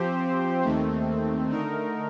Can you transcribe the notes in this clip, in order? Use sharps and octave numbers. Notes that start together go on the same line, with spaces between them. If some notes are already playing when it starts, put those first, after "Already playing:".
Already playing: F3 C4 G4 C5
D#2 D#3 A3 C4
D3 A3 D#4 A#4